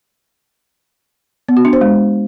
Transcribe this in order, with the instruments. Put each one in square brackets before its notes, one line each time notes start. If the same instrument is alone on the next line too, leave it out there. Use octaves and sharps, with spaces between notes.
[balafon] B3
F#4
D4
C5
G#3